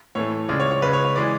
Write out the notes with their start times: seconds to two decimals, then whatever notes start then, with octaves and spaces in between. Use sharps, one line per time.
0.15 A2 E3 A3 C#5
0.49 C#2 C#3 G#3 D5
0.60 C#5
0.71 C#5
0.82 C#2 C#3 G#3 B4
0.93 C#5
1.05 C#5
1.16 E3 G#3 D5